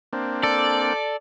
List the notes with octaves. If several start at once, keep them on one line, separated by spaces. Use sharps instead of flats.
A#3 C4 D4
A4 D5